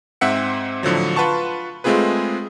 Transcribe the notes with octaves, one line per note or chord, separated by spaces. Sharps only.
G#2 C4 E5 F#5 C#7
A2 D3 F3 F#3
F4 B4 F#5 A5 C#6
G#3 A3 C4 F4 G#4 B4